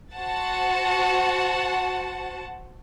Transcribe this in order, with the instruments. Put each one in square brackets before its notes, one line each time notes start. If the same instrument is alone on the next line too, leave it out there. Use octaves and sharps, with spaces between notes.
[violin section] F#4 C5 F#5 A5